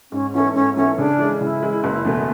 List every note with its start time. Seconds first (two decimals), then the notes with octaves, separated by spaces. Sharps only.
0.12 G#2 C#4
0.34 E3 B3 C#4 E4 A4
0.54 G#2 C#4
0.76 E3 B3 C#4 E4 A4
0.98 C#3 D4
1.18 E3 G#3
1.40 C#3 E4
1.62 E3 G#3
1.84 F#1
2.05 E2 B2 A3